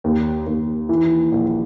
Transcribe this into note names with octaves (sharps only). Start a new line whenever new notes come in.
D#2
D#2
E3
A#1